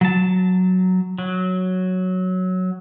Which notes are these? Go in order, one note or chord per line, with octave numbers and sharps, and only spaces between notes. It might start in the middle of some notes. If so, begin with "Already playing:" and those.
F#3 A5
F#3